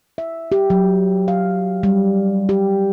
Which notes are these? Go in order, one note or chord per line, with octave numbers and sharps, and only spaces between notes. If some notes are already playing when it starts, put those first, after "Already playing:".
E5
G4
F#3
F5
G3
G4